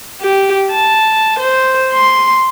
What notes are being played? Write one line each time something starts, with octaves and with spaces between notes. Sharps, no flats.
G4
A5
C5
C6